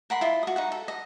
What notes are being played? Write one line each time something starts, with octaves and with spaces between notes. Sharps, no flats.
A#4 F#5 B5 C6
E4 F4 D#5
F#4 D#6
D#4 F#4 F#5
A4
D#5